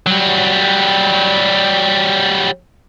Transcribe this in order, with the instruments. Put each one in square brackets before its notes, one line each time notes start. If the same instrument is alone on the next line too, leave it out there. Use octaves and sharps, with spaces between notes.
[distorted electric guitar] F#3 G3